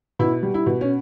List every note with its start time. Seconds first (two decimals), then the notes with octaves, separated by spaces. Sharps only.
0.19 B2 E4
0.43 G3
0.54 E4
0.66 B2
0.81 C#4